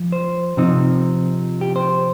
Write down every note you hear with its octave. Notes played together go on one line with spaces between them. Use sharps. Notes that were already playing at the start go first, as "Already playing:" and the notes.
Already playing: F3
C5
C3 F3 C4 D#4
G4
C5